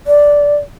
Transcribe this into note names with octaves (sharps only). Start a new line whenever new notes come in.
D5